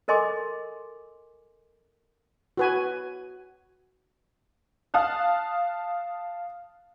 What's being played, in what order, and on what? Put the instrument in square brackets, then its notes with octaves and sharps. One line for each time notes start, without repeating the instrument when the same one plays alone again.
[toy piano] A4 A#4 D#5 G#5 C6 D6
[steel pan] F#4 B4 G#5
[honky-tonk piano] F5 A5 D#6 F6 F#6